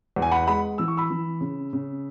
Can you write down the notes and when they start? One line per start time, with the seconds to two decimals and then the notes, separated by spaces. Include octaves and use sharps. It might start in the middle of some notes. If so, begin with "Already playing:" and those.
0.16 E2
0.22 G#5
0.31 F#5 B5
0.47 G#3 F#5 B5
0.78 E3 E6
0.88 C#6
0.97 B5 E6
1.10 E3
1.41 C#3
1.73 C#3